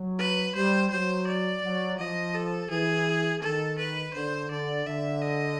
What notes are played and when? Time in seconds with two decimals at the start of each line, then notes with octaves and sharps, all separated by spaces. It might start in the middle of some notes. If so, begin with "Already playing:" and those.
Already playing: F#3
0.19 B4
0.55 G3 C5
0.91 F#3 C5
1.27 D5
1.63 F#3
1.99 F3 D#5
2.35 A4
2.70 E3 G#4
3.42 D#3 A4
3.79 B4
4.14 D3 C5
4.50 D3 D5
4.86 D3 E5
5.22 D#5